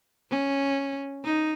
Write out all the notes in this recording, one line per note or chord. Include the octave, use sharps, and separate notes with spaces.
C#4
D#4